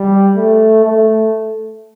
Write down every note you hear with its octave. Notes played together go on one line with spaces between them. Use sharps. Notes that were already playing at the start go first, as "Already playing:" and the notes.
Already playing: G3
A3
A3